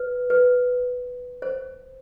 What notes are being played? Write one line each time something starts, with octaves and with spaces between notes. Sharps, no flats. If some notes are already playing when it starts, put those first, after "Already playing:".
Already playing: B4
B4
C5